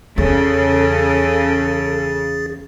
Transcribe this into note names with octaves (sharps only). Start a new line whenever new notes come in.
E2 C#3 C#4 G#4 A4 A6